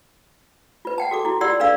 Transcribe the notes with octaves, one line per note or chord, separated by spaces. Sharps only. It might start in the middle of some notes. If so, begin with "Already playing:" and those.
F4 B4
F#5 G5 A5
F#4 A4 D6
E4 F#4
F4 G4 D5 F#5 C6 E6
D4 A4 B4 D5 F5 E6